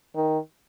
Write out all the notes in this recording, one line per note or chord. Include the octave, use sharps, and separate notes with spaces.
D#3